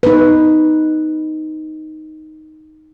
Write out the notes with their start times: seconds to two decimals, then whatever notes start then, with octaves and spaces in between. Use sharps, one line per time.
0.03 D#4 B4